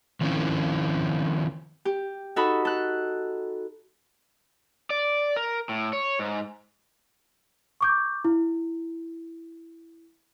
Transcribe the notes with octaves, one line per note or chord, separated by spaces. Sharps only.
D#3 F3 C4 C#4 E4 F4
G4
D#4 F#4 A4 B5
A4 F#6
D5
A#4
A2
C#5
G#2
C#6 D6 G6
E4